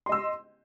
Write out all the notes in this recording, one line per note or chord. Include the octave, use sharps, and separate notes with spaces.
D#5 C6 E6